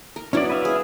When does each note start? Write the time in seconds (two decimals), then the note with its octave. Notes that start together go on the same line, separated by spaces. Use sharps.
0.16 A#4
0.33 F#3 B3 C#4 D4 E4 D5
0.50 B4 E5 F5
0.65 G#4